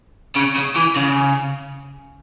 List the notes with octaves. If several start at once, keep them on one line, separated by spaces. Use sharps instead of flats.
C#3
C#3
E3
C#3